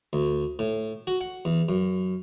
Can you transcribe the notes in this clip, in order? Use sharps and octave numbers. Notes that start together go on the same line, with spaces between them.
D2
A2
F#4
F#5
E2
F#2